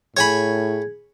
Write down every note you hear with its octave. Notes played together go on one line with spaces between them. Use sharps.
A2 G#4 C#5 G#5 B5